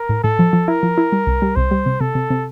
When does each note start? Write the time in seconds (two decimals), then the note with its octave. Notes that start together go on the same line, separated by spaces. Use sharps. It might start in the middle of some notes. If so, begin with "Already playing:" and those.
Already playing: A#4
0.09 A2
0.23 A2 A4
0.39 F3
0.53 F3
0.68 E4 A#4
0.83 F3
0.98 E4
1.12 G3
1.27 C2
1.42 G3
1.56 C2 C5
1.71 G3
1.86 C3
2.01 C3 A4
2.15 C3
2.30 C3